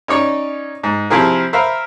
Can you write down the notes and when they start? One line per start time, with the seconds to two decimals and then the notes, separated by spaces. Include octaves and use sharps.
0.08 C#4 D#4 C#5 D5
0.84 G#2
1.10 C3 F3 C4 E4 G#4 A#4
1.53 A#4 C5 E5 F5 B5